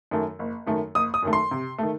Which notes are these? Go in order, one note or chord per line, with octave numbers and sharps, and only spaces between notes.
F#2 D#3 A3
F#1
F#2 D#3 A3
F#1 D#6
D#6
F#2 D#3 A3
C6
C3
D#3 A3